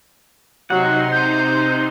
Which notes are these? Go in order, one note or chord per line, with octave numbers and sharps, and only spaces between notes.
C3 F#3 D#4 F#5 C6
C5 G6